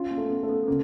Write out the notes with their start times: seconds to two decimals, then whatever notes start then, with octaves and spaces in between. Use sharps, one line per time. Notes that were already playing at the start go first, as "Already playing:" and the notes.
Already playing: C#4 F4
0.11 A#3
0.17 A3
0.30 B3
0.43 A3
0.49 B3
0.63 B3
0.67 C#3 A#3